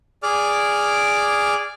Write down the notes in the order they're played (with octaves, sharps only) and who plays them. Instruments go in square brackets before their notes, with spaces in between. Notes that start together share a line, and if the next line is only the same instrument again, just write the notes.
[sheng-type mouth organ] G#4 D5 D6 F6